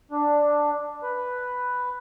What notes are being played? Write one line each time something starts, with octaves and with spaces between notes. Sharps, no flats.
D4
B4